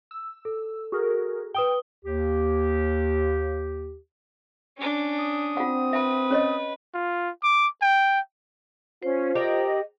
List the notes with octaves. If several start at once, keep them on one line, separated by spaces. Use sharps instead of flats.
E6
A4
F#4 G#4 A#4
B4 G5 D#6 G7
D#2 G4
C#4 D4
D#6
C4 F4 F#5
B4 E5 G5
C#4 C#5 D#5
F4
D6
G5
C#4 F4 C5
G4 A#4 D5 D#5